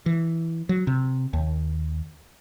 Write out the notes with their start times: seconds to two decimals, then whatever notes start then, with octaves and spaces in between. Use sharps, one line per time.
0.06 E3
0.69 F#3
0.87 C3
1.33 D#2